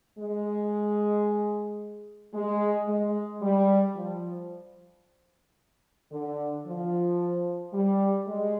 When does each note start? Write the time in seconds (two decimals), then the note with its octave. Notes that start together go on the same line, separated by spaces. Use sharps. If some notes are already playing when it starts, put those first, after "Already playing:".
0.19 G#3
2.34 G#3
2.88 G#3
3.43 G3
3.96 F3
6.11 D3
6.66 F3
7.74 G3
8.27 G#3